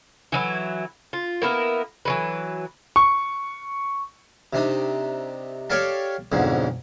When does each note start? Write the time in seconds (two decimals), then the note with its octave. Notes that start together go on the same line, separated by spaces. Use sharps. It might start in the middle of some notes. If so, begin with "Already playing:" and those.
0.32 E3 F#3 E4
1.13 F4
1.42 A#3 B3 E4 A#4
2.05 E3 F#3 B4
2.96 C#6
4.53 C3 D4 D#4
5.70 G4 A4 C#5 D5 F5 A5
6.32 B1 F2 G#2 D3